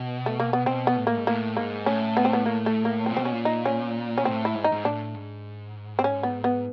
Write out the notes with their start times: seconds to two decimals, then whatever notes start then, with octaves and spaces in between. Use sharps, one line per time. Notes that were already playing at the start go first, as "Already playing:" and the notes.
Already playing: B2
0.26 A3
0.40 A#3
0.53 B3
0.66 B2 C4
0.87 B3
0.96 A2
1.07 A#3
1.17 G#2
1.27 A2 A#3
1.57 G#2 A#3
1.86 A2 C#4
2.17 B3
2.25 C4
2.33 B3
2.46 A#3
2.66 A3
2.85 A#3
3.05 A#2 C4
3.17 B2 C4
3.25 C#4
3.31 A#2
3.45 D#4
3.66 C#4
4.18 C#4
4.25 A2 C4
4.45 E4
4.55 G#2
4.64 D#4
4.72 G#2
4.84 A2 D4
5.14 G#2
5.99 C4
6.04 C#4
6.23 B3
6.44 B3